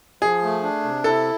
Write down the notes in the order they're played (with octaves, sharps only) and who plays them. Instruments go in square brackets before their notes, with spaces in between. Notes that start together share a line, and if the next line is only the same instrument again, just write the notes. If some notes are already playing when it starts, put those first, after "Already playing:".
[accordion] F3 [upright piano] G#4
[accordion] A3
D4
C3
[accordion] E4 [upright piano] A4